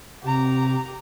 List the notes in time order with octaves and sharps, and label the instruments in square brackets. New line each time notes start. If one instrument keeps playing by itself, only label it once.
[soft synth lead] C3 [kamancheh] G4 A#5